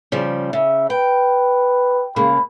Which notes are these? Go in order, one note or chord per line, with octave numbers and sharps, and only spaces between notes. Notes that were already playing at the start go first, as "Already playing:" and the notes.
C#3 F3 G3
C#3 E5
B4 G5
C#3 G#3 A#3 B5